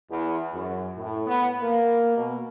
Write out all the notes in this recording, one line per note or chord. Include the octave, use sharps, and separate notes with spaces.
E2
F#2
A2
B3
A#3
B2